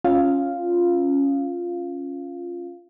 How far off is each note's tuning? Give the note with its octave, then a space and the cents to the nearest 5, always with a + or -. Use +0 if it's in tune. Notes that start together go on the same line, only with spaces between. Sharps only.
C#4 -5 F4 +0 F5 +0